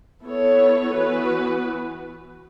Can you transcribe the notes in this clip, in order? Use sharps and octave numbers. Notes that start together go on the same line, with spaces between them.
B3 E4 A4 C#5
E3 B3 F#4 B4